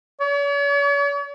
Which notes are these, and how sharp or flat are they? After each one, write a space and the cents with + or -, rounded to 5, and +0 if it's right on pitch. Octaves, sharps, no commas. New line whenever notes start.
C#5 +45